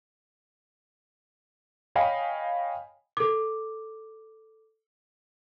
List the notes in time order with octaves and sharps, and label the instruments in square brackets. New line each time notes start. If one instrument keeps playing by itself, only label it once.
[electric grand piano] C#5 D#5 F5 G5 G#5 B5
[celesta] A4 D6